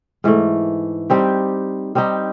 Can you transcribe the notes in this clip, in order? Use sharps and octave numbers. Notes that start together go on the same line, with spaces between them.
G#2 E3 A3
G3 C4 D#4 G4
G3 C4 D#4 G4